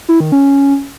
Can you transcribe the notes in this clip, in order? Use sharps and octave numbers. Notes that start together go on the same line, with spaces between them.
E4
D#3
C#4